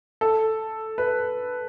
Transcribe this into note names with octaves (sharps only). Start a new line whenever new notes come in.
A4
B4